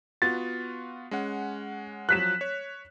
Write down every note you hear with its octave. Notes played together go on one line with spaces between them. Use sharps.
B3 F4 F#4 A6
G#3 C#4 F#5
F3 F#3 F#6 B6 E7
C#5